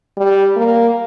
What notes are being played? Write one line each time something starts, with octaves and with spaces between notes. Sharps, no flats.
G3
A#3